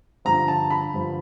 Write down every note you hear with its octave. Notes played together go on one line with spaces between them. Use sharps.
G2 D3 F3 A#5
A5
B5
G2 D3 F3